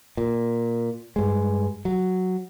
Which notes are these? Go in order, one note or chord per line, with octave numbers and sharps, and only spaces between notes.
A#2
G2 G#3
F#3